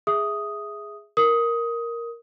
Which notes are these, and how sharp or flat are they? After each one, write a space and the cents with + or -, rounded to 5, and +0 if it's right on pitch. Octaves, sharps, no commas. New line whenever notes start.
G#4 +0 E5 +0 D#6 +0
A#4 +0 D#6 +15